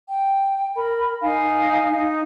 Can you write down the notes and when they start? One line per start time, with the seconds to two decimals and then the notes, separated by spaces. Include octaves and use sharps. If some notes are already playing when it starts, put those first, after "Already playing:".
0.10 G5
0.77 A#4 B5
1.22 D#4 F5 G#5
1.93 D#4